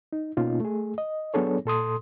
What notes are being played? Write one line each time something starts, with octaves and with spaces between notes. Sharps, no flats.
D#4
B2 A#3 C#4 D#4 F4
A3 G#4
D#5
F#3 B3 D4 G#4 A4 C#5
A#2 A4 C6 D#6